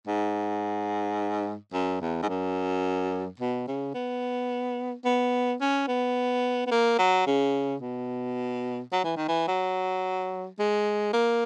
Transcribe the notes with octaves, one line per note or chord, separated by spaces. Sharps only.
G#2
F#2
E2
G#2
F#2
B2
C#3
B3
B3
C#4
B3
B3
A#3
F#3
C#3
B2
F#3
E3
D#3
E3
F#3
G#3
A#3